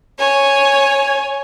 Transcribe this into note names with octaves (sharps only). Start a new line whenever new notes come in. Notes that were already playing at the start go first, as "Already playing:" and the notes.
C#5 G#5